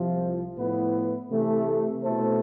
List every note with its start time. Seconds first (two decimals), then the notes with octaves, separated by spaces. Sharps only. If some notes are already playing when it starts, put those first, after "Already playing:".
Already playing: C2 C3 F3
0.58 A2 F3 B3 E4 B4
1.30 C3 E3 A3
2.03 B2 A3 E4 A4 C5